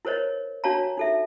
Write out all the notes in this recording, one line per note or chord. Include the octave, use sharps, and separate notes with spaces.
E4 A#4 C5 C#5 D#5
D4 F#4 C#5 F5 A5 A#5
D#4 A4 E5